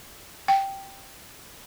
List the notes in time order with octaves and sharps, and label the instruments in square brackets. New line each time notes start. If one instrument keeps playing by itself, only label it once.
[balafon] G5